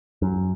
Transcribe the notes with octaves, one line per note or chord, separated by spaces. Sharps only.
F#2